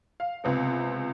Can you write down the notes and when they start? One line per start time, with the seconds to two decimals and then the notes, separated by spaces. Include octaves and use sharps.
0.20 F5
0.44 C#2 C3 B3